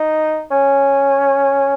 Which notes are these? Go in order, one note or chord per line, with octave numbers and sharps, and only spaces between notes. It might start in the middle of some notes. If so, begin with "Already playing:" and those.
Already playing: D#4
C#4